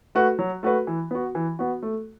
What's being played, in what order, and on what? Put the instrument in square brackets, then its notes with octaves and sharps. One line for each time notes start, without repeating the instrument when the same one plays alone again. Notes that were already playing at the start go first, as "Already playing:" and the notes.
[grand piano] A3 F#4 B4
F#3
A3 F#4 B4
E3
B3 F#4
E3
B3 F#4
A3